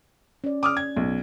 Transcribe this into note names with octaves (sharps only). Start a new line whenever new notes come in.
C#4 D5
D6 D#6 F6
G#6
B1